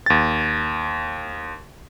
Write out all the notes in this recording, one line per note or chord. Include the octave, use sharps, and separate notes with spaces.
D#2 A6